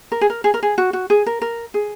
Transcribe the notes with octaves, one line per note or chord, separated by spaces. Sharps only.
A#4
G#4
A#4
G#4
A#4
G#4
F#4
F#4
G#4
A#4
A#4
G#4